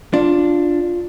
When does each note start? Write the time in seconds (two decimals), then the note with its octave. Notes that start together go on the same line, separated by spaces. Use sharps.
0.14 D4 F4